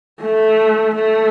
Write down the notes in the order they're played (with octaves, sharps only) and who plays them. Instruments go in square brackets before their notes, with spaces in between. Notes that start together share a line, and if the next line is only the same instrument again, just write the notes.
[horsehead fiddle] A3
A3